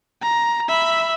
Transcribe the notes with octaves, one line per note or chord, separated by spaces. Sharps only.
A#5
E5 B5